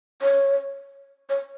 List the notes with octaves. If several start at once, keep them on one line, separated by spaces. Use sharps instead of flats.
C#5
C#5